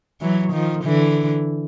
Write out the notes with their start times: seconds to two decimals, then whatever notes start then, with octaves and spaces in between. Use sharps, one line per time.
0.21 E3 F#3
0.52 D#3 F3
0.84 D3 E3